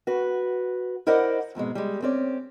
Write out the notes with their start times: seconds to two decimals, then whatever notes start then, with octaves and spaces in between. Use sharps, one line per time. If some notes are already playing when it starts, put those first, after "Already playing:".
0.07 F#4 B4
1.07 E4 A#4 C5 D5 D#5 F#5
1.55 F2 G#2 B2 G#3
1.75 G3 G#3
2.02 C4 C#4 D5